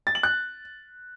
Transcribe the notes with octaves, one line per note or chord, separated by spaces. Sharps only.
A6
F#7
F#6